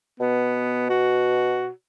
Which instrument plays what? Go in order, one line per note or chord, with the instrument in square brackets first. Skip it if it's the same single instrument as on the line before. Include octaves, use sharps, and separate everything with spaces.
[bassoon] B2 [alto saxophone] B3
[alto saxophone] F#4